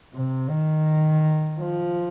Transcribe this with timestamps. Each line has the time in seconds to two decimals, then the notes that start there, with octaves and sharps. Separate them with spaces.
0.15 C3
0.50 D#3
1.60 F3